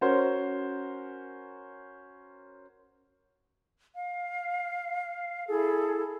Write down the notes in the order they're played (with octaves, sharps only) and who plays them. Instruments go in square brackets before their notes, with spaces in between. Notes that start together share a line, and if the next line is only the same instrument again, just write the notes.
[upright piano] C#4 F#4 A#4 C5 C#5
[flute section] F5
E4 G#4 A4